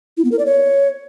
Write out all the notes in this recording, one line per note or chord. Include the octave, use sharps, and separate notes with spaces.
E4
B3
A#4
D5
C#5